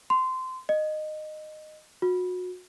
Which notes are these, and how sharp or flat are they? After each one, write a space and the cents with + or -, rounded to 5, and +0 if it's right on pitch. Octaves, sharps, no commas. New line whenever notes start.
C6 -20
D#5 -15
F#4 -30